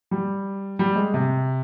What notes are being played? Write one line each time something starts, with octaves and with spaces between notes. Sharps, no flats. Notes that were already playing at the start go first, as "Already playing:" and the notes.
G3
G3
G#3
C3